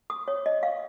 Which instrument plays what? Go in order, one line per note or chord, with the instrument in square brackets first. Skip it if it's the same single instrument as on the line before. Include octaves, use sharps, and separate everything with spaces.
[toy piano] D#6
C#5
D#5
F5